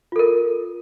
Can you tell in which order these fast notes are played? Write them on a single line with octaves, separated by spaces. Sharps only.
F4 A4 A#4